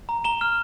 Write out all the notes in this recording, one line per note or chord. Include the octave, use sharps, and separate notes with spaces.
A#5
A#5 E7 G7
F6